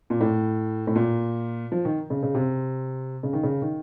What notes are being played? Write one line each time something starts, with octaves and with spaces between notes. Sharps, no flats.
A#2
A2
A2
A#2
F3
D#3
C#3
C#3
C3
C#3
D#3
C#3
D#3